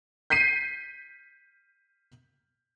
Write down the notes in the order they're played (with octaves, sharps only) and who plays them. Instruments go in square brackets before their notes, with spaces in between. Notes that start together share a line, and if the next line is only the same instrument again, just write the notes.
[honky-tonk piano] G6 B6 C7 D#7